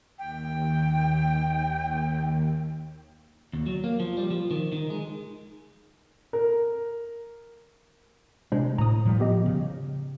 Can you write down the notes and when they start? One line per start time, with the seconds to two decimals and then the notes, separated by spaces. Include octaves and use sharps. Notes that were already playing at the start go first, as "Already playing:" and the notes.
0.19 D#2 G5
3.53 D#2
3.66 F#3
3.84 A#3
4.00 F3
4.17 G3
4.31 F3
4.51 D#3
4.72 D#3
4.90 G#3
6.33 A#4
8.52 C3 G#3 D4 C5
8.78 A2 A#5 D#6
9.05 A2 F3 G3
9.20 B3 G4 D#5
9.46 C#3